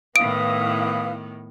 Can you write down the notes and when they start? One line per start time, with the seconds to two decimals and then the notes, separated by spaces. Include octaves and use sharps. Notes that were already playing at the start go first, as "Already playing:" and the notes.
0.16 A2 D#3 B3 E4 B4 F5 D#6 D7